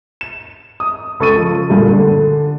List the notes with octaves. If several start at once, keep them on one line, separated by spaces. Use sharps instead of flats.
E7
D#6
C#2 A4 C#6 A6 D#7
F3
D2 G2 A#2 G#3
D3